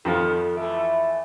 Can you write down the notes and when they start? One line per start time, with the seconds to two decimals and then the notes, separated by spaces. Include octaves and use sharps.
0.05 F2 D#3 F3 B3 A4
0.57 E3 A3 E5